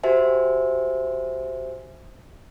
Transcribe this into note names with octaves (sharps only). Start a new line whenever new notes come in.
F#4 G4 C5 E5 G#5